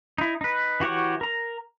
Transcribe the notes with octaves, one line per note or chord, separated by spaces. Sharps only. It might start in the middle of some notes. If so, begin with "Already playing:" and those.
D#4 E4
D#4 B4
E3 F#4 G4 C#5 F#5
A#4 A#5